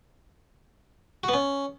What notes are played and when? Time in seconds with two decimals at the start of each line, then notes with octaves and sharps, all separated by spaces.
1.24 F#4
1.29 B3
1.34 C#4